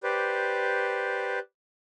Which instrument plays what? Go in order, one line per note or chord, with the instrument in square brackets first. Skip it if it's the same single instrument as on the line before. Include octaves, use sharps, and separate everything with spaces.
[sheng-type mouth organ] G4 B4 C5 D5